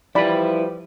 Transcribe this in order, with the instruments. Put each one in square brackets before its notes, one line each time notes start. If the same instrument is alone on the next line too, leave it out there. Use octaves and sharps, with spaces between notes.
[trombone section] F3 G3 [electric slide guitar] E4 B4 [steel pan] D5 B5